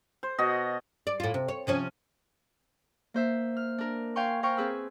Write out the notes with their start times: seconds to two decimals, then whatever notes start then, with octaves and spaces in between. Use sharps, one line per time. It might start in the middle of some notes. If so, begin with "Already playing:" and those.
0.23 C5
0.38 B2 F#4 D#5
1.07 D5
1.20 A2 F4
1.34 C3
1.48 C#5
1.67 C3 F3 C#4
3.14 A#3 C5 E5
3.57 F6
3.78 D4 A#4
4.16 F5 G5 G#5 C6 C#6
4.43 A#4 C5 G5 C#6 F6
4.57 C4 G#4 B4 E6